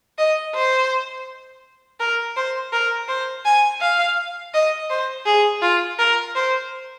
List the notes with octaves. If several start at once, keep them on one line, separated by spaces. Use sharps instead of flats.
D#5
C5
A#4
C5
A#4
C5
G#5
F5
D#5
C5
G#4
F4
A#4
C5